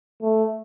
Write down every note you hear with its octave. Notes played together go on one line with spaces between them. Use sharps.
A3